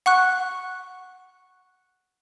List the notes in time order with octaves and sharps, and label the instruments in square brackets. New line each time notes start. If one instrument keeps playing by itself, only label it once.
[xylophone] F#5 C#6 F#6